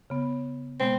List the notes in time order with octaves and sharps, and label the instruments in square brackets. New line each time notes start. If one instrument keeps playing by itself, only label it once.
[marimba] C#3 B3
[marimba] B2 G#3 B3 [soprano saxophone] C4